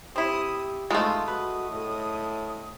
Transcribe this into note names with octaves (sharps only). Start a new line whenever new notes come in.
C4 E4 G4 D#6
D#3 G#3 A3 B3 F4 D#6
F#4 B4
A2